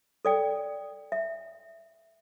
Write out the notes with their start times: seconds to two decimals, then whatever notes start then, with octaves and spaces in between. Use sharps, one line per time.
0.25 A4 D5 G5
1.12 E5